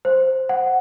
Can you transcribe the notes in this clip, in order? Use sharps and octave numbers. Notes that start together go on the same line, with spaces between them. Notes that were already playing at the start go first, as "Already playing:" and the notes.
C5
F#5